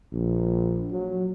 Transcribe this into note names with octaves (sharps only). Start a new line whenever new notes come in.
A#1
F#3